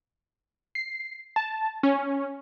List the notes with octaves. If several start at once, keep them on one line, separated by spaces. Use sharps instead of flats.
C7
A5
C#4